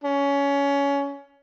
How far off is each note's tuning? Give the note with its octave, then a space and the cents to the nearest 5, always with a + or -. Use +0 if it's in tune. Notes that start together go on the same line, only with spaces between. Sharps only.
C#4 +20